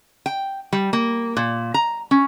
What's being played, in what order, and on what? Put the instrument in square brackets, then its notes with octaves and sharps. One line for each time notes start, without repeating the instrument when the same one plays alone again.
[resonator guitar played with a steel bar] G5
G3
A#3
A#2
A#5
C#4